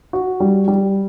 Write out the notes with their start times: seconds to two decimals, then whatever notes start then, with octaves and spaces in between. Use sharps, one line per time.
0.13 F#4
0.40 G3
0.68 G3